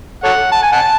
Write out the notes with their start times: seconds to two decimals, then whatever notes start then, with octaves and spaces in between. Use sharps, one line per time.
0.24 A4 C#5 F#5
0.52 A5
0.63 G#5
0.72 F#5 A5